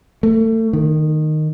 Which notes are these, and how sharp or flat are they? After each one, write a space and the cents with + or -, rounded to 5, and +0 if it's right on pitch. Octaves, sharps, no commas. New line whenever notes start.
A3 +30
D#3 -15